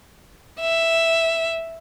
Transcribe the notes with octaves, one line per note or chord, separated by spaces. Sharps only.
E5